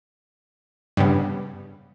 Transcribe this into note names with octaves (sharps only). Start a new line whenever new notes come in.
G2 C#3 B3